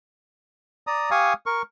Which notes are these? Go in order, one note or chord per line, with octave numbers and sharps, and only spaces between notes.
D5 A#5 D#6
G4 F5 G#5 C#6 D#6
A#4 C#6